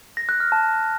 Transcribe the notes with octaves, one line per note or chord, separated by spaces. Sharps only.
A#6
F#6
F6
A5